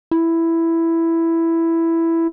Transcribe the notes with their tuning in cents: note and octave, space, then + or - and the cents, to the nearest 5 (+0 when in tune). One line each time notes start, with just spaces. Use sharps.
E4 +5